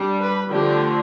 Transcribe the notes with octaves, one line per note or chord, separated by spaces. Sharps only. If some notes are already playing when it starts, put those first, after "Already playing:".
Already playing: G3 D4
B4
D3 F3 A3 D4 G4